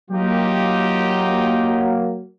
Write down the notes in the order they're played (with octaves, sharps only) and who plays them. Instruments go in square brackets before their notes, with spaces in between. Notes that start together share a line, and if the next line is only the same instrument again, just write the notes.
[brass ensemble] F#3 A#3 [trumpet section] D#4 F4 G4